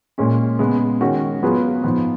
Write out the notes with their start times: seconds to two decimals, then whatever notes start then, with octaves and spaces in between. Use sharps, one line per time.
0.18 A#2 G#3 C#4
0.59 C#3 G#3 B3
1.01 D#3 G#3 C#4 F#4
1.43 F#3 B3 F4 G#4 B4
1.83 G#2 F3 B3